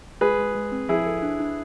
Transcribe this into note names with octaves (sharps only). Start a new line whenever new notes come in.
G#3 G#4 B4
G#3
G#3
C4
F3 E4 G#4
A4
D4
D4